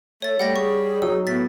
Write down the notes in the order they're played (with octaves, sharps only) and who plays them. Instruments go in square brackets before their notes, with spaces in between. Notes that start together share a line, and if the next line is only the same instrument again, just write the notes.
[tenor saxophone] A3 [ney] A4 [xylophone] C#5 A6
[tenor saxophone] G3 [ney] A3 [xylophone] F#5 G5 A#6
[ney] G#4 [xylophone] C#6
[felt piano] F#3 [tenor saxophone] D#4 [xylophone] E6
[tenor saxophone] A2 [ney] B3 [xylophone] A6 B6